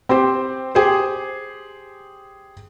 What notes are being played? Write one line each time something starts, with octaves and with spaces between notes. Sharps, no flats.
C4 G4 C5
G4 G#4 C5